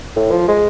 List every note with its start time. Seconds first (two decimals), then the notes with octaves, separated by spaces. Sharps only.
0.16 A2
0.31 F3
0.48 G#3